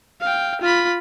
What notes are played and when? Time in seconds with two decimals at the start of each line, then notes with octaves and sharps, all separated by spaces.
0.21 F5 G5
0.61 F4 B5